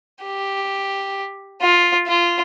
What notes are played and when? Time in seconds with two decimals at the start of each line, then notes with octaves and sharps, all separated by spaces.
0.24 G4
1.62 F4
2.07 F4